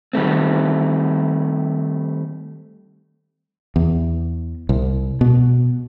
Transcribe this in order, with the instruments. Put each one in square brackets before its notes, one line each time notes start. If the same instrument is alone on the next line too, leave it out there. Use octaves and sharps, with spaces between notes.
[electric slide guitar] D#3 G3 A3 C4
[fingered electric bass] E2
C2
B2